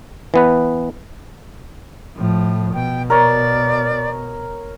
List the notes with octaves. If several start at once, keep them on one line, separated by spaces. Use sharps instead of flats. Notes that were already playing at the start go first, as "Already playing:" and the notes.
E3 B3 B4
A2 F3
B2 G5
A#4 C#5 D5